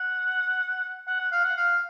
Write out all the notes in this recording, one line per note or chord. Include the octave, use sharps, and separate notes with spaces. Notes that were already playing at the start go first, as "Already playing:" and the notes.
Already playing: F#5
F#5
F#5
F5
F#5
F5